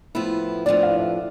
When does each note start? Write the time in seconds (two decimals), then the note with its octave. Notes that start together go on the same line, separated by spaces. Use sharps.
0.15 A2 F3 B3 E4
0.66 A2 F3 B3 D4 D5
0.83 F5
0.96 D5
1.00 E5